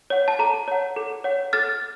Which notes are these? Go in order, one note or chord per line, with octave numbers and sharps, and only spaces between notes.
C#5 F#5
A5
A4 A#5
C#5 F#5
A4
C#5 F#5
A4 F6 A6